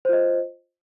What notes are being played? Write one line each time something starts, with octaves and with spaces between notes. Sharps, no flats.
F4 C5 D#5